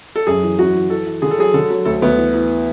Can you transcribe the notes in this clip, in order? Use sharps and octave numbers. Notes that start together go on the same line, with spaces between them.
A4
F#2 G#4
E3
F#2 F#4
E3
E3 A4
E3
D3 G#4
A4
F#3 G#4
D3 A4
F#3
D2 A4
D2 B3
E3
E3